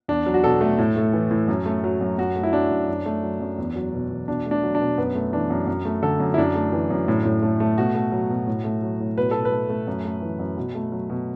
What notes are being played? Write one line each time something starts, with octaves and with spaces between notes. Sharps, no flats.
E2 D4
F#3
F#4
B2 A4
A3
A2
A3
E3
A2
F#2
A3
F#3
F#2
F#2 F#4
A3
E4
F#3 D4
F#2
F#2
A3
F#3
F#2
E2
F#3
B2
E2
B2 D4
A3
D4
F#3
D4
B2
F#2 B3
A3
E3 D4
F#2
F#2
A3
D3 A4
F#2
E4
F#2 D4
A3
E3
F#2
A2
A2
A3
A3
B2 F#4
A3
F#3
B2
A2
A3
F#3
A2
B2 B4
B2 A4
B4
A3
A3
F#2
A3
E3
F#2
B2
A3
F#3
B2